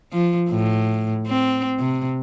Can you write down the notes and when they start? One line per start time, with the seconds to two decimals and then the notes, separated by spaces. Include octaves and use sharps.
0.13 F3
0.50 A2
1.27 C4
1.79 C3